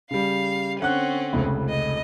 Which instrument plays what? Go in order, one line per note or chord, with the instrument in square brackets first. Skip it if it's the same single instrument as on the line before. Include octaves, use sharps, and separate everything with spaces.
[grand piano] C#3 G3 [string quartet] F5
[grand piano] D3 F#5 F#6 [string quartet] C4 C#4
[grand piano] F1 C#2
[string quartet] D#5